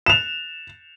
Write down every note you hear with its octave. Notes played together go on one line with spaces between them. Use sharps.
E7 F7